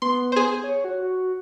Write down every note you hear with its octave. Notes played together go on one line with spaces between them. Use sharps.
B3 C6
G#4 C5
C#5
F#4